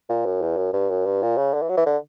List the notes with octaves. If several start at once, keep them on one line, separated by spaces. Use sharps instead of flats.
A#2
F#2
E2
F#2
G2
F#2
G2
A#2
C#3
D3
E3
F#3
E3
D3